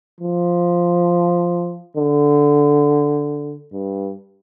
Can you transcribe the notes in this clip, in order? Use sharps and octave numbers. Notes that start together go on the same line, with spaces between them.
F3
D3
G2